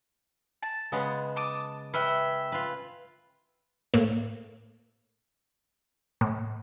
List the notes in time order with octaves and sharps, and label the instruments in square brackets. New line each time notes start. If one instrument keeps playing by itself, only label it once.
[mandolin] A5
[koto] C#3 G#3 B3
[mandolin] A5 D6 D#6
[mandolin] C#4 E5 G5 [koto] B4
[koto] F4 B4
[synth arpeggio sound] A2 A#3
A2